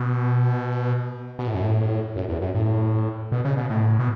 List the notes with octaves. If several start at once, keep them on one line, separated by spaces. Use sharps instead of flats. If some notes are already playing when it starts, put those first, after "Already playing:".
Already playing: B2
B2
A2
F#2
A2
F#2
E2
F#2
A2
B2
C#3
B2
A2
B2